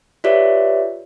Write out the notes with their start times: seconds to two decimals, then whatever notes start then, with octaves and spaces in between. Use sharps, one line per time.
0.24 F4 G4 B4 C#5 D5 E5